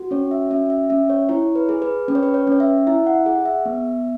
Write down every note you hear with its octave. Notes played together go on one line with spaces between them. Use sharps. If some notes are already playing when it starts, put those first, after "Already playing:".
Already playing: F#4
C#4 C#5
E5
C#4 E5
E5
C#4 E5
C#5
E4 C#5
B4
G#4
B4
C#4 B4
C#5
B4
C#5
C#4
C#5
E5
E4 E5
F#5
G#4 F#5
E5
B3